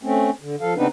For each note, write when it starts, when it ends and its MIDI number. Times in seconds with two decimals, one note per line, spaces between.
0.03 0.30 57
0.03 0.30 60
0.03 0.30 61
0.41 0.56 50
0.61 0.74 53
0.61 0.74 69
0.61 0.74 77
0.76 0.87 49
0.76 0.87 59
0.76 0.87 60
0.76 0.87 62
0.76 0.87 63
0.76 0.87 71